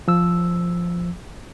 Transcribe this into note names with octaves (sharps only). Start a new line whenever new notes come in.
F3 E6